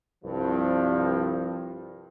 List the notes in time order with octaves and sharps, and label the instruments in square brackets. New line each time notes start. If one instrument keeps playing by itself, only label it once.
[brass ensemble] C2 G2 F3